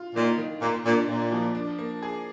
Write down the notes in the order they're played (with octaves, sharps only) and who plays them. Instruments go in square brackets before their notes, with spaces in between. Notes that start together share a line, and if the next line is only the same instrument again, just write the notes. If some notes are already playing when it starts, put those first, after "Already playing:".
Already playing: [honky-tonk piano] F4
[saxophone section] A#2 [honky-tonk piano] D#3
[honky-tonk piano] D#3
[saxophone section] A#2 [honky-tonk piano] A#3
[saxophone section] A#2 [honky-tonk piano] D4
[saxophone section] A#2 [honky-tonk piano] A#3
[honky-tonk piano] F3
D4
A#3
G#4